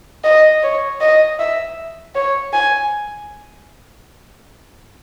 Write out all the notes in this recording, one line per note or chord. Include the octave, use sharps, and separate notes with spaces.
D#5
C#5
D#5
E5
C#5
G#5